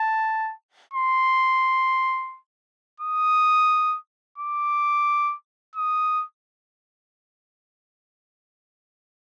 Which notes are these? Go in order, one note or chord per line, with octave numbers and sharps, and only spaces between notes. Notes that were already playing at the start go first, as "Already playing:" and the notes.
Already playing: A5
C6
D#6
D6
D#6